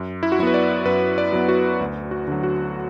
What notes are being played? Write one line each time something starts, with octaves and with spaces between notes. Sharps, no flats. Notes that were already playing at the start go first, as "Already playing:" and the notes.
Already playing: F#2
E4
F#4
F#3 B3 E4 B4
D5
F#2 B4
D5
F#3 B3
F#4
D2
F#4
D3 F#3
F#4